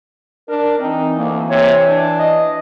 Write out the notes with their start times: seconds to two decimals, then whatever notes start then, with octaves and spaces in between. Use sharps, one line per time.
0.49 D4 A#4
0.80 E3 C4 D#4
1.18 D2 A#3
1.50 C3 C#5
1.87 D4
2.19 D#5